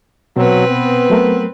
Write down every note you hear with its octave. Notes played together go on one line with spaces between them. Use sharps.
B2 F#3 C4 B4
B3
F#3 A3 A#4